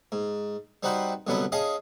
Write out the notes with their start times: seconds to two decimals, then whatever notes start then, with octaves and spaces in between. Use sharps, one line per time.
0.12 G#2
0.83 G3 C4 D#4 F#4 B4 C5
1.27 C2 B2 D3 F#3 B3 B4
1.52 C#4 G#4 D#5 F5 A5